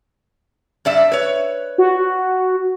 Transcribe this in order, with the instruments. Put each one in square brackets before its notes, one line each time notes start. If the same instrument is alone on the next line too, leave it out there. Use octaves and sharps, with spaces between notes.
[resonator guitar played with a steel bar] G2 D5 E5
B4 C#5
[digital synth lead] F#4